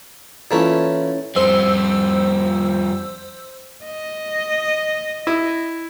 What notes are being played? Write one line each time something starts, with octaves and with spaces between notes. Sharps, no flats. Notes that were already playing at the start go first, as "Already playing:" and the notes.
A#2 E3 A3 C#4 E4 A4
F2 G3 C5 E6
D#5
E4